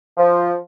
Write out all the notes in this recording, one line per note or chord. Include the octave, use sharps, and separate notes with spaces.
F3